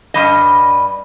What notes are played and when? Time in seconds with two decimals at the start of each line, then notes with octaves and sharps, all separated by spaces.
0.14 G2 G3 D#5